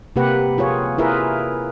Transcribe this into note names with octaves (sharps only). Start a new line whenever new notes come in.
C3 A#3 G4 B4 F#5
F4 G#4 C#5
E4 F4 G#4 A#4 B4 E5